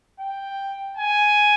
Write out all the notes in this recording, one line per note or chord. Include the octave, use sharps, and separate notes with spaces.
G5
G#5